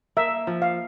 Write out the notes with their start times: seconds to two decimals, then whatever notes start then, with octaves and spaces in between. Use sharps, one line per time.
0.17 A#3 E5
0.47 F3
0.62 F5